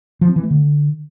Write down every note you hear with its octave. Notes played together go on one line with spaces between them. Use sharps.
F3
C4
E3
A3
D3